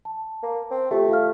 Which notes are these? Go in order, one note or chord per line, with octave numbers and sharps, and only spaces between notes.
A5
A#3
C4
A3 F4 G4
F4 F5 F6